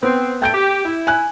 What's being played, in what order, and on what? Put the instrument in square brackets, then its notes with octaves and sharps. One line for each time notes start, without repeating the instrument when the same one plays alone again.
[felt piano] B3 [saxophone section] C4
[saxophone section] A3 [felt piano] G5 G6 D7
[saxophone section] G4
E4
[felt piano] G#5 F#6